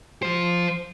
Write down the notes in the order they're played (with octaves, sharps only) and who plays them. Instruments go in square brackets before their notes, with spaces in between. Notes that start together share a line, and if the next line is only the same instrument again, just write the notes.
[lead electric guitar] F3 C5